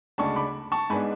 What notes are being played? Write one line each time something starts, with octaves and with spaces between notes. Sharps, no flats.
D2 C#3 G#3 D4 A5 C#6
B5 D6
A5 C#6
G#2 G#3 B3 D4 G#5 B5